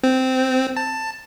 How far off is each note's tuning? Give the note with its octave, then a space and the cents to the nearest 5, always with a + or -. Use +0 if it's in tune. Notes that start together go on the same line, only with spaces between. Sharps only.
C4 -10
A5 +10